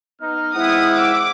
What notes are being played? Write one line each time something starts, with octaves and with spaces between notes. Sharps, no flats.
B3 D#4 F6
G#3 C4 E4 F#5 D#6
D6 E6